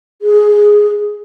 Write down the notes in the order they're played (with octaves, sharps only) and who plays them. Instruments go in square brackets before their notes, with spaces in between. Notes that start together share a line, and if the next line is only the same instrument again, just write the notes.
[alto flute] G#4